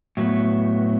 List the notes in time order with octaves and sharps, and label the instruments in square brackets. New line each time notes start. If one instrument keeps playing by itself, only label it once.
[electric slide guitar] A2 F#3 B3